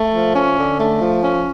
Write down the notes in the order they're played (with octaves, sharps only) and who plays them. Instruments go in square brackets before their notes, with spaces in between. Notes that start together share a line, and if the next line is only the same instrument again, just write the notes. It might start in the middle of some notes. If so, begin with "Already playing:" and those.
Already playing: [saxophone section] A3
F3
C#4
D3
A3
F3
C#4